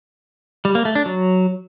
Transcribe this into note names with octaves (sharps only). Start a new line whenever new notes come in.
G3
A#3
A3
D4
F#3